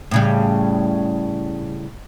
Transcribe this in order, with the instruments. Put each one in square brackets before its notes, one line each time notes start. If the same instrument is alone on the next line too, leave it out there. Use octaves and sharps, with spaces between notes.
[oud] A2 C#3 G3